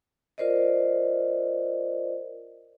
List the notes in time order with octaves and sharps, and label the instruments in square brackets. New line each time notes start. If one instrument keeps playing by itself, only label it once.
[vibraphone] F4 A#4 C5 D5 D#5